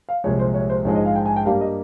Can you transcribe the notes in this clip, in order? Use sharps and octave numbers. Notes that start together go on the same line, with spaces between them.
F5
C2 A#2 F3 G#3 C#5
C5
C#5
C5
A#1 G#2 F3 G#3 C#5
D#5
F5
G5
G#5
G5
G2 G3 A#3 F5
D#5